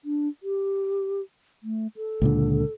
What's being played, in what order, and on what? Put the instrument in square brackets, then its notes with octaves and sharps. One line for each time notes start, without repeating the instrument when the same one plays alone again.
[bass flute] D4
G4
A3
A4
[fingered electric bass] C#2 A#2 D3